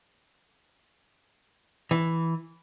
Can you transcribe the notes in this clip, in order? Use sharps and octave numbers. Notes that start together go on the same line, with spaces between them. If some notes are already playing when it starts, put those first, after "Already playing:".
E3